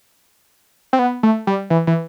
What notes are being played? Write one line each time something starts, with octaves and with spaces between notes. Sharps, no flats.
C4
B3
A3
G3
E3
E3